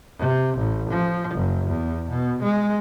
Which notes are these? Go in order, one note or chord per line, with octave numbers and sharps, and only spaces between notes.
C3
A1
F3
F#1
E2
B2
G#3